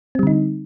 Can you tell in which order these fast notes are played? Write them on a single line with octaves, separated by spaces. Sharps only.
C4 G3 D3 D#4